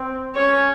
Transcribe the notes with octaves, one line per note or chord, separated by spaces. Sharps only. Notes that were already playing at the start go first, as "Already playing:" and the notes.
Already playing: C4
C#4 C#5